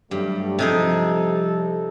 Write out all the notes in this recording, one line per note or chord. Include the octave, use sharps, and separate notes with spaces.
G2 F#3 G3 A3
C3 F3 G3 D#4 G#4 A4